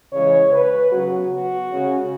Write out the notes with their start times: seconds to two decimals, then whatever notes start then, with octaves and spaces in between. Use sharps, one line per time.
0.12 C#3 E3 G#3 C#5
0.52 B4
0.91 C#3 F#3 B3 F#4
1.30 F#4
1.70 C#3 G#3 C#4